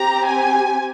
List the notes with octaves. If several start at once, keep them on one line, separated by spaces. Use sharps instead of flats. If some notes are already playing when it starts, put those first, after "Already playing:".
Already playing: C4 G4 A#5
G#5